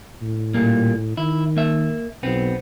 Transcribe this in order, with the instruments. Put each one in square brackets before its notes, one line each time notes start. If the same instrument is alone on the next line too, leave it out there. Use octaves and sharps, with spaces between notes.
[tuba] A2
[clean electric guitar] A#2 G3 A#3
[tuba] D#3 [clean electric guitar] E4
[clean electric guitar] A#3 E5
[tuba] B1 [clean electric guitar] B3 C4